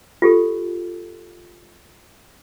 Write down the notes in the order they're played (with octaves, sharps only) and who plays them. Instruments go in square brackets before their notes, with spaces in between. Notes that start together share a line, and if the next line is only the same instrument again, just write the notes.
[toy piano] F4 G4 A4